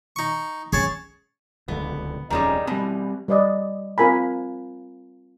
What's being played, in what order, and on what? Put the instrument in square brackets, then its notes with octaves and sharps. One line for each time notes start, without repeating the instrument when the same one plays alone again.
[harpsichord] D#4 C#6
[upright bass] C#4 [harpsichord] G#4 C#5 A5
[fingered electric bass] D1 C#2 D3 [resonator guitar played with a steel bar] B3
[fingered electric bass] D#1 F2 C#4 [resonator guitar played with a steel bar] D#3 G3 G#3
[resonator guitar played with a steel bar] B2 E3 [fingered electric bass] G3 B3 C4
[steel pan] G3 B4 D5 D#5
C4 F4 A#4 G#5 B5